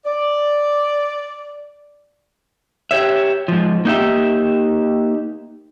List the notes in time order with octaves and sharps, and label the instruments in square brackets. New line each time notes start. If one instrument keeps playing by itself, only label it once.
[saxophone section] D5
[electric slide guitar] G4 C#5 E5
G#2 F3
A#3 D#4 G4 E5